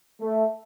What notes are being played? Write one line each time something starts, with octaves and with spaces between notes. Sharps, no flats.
A3